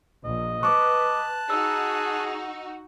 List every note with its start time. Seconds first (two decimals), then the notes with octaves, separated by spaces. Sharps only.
0.25 A#1 D#5
0.63 B4 A5 C#6 D6 F#6
1.50 D#4 F#4 G#4 E6